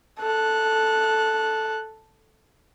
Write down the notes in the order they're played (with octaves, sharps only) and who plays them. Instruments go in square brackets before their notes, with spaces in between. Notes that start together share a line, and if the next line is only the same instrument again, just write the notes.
[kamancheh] A4 F#6